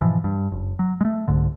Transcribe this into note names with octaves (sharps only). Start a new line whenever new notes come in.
G#2 B2 E3 F3
G2
F#1
F#3
G#3 A3
C2 G#2 D3